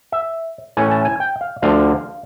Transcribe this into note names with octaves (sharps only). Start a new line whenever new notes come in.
E5
A2 E3 A3 C#4 G#5
A5
G#5
G5
F5
D2 D3 F3 F5